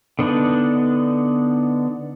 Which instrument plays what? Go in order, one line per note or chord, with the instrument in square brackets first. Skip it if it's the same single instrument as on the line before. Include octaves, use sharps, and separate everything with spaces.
[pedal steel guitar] D3 B3 D4 D#4